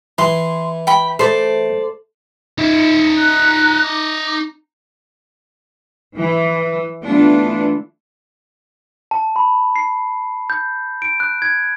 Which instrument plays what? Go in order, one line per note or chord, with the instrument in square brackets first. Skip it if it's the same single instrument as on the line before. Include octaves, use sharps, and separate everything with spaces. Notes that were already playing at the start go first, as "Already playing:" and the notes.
[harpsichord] E3 [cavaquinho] C6
[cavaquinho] G5 B5
[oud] A3 [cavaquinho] C5 D5
[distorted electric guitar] D#4 E5
[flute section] A#5 F#6
D6
[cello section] E3
E3 A3 B3 D4 F4
[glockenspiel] A5
B5
C7
G6
D7
F#6
G#6